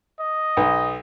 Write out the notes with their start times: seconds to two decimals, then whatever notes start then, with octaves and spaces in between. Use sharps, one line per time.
0.20 D#5
0.57 B1